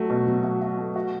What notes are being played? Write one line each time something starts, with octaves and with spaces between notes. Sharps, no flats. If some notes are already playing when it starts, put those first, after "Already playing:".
Already playing: F#3 A3 F#4
B2
F#3
F#4
F#4
A3
F#4